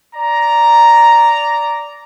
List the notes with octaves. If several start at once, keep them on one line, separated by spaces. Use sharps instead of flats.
D5 A#5